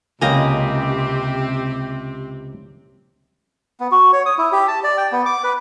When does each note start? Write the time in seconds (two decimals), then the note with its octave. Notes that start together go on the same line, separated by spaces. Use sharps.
0.21 C#2 C3 A#3 C4 G4 D#5 G5 G#5
3.80 B3
3.92 F#4
4.13 C#5
4.26 D#6
4.38 E4
4.52 G4
4.68 A5
4.84 D5
4.98 G5
5.12 B3
5.26 D6
5.44 B4